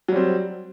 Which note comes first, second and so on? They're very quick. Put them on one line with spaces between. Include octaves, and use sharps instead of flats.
F#3 G3 C4